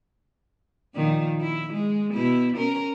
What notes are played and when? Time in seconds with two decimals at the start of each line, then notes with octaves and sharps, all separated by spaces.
0.95 A#2 D#3 F3
1.41 E4
1.74 G#3
2.14 B2 E4
2.57 C#4 A#4